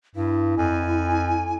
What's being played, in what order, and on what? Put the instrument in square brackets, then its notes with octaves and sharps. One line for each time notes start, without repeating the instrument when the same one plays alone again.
[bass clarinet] G2 [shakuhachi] E4
[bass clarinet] F2 [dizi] G#5